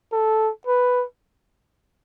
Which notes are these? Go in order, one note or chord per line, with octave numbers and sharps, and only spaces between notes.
A4
B4